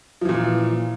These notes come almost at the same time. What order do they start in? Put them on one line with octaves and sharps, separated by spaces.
F3 E3 A#2